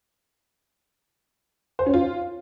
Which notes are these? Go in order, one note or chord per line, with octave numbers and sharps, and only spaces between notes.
C5
C#4
F4